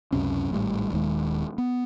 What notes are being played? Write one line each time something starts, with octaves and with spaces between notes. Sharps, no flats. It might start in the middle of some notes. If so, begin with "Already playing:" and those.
C#2 F#2 C3 C#4
G#1 A2 G3
D#1 D#2 D#3 G#3
B3